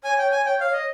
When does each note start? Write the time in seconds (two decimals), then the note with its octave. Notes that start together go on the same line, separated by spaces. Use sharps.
0.04 C#5 G#5
0.18 G5
0.32 G#5
0.46 G5
0.60 F5
0.73 D#5